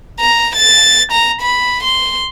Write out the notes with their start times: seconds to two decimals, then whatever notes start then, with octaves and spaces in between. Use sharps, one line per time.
0.20 A#5
0.56 A6
1.12 A#5
1.41 B5
1.83 C6